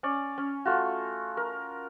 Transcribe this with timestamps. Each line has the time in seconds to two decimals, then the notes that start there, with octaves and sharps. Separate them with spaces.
0.03 C#4 C#5 D5
0.38 C#4
0.65 A3 F4 F#4
1.37 A#4